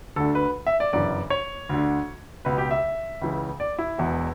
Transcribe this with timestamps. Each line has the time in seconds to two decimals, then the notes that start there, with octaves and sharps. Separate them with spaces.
0.16 D2 D3 A4
0.35 B4
0.67 E5
0.80 D5
0.93 G1 F#2 C#3 E3 D5
1.30 C#5
1.69 D2 D3
2.45 C#2 B2 B4
2.58 G4
2.71 E5
3.22 C#2 C#3 E3
3.60 D5
3.79 E4
3.98 E1 E2 B2